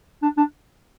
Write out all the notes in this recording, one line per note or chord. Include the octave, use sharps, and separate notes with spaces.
D4
D4